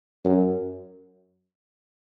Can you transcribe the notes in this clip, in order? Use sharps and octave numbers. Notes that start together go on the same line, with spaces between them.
F#2